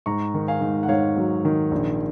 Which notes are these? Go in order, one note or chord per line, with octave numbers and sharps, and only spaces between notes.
G#2 A#5 C#6
D#3
F5 G#5
G#2
F#5
G#2 C#5 F5
F#3
D#3
A#1